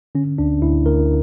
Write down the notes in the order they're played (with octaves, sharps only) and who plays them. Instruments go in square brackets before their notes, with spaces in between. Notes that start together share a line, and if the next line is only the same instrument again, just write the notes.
[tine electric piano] D3 C#4
D2 D4
D2 E4
D2 A#4